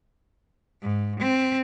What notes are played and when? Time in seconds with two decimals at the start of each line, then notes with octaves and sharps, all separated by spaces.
0.82 G#2
1.20 C4